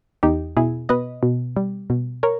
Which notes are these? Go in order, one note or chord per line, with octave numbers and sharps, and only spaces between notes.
E2 D#4 G4
B2 E4 G#4
B2 B4 D#5
B2
G3
B2
A#4 C#5